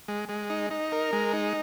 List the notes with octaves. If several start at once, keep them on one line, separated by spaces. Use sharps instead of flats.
G#3
G#3
D#4
D#4
A#4
G#3
D#4